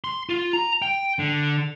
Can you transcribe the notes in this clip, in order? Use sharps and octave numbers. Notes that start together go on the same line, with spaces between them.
C6
F4
A#5
G5
D3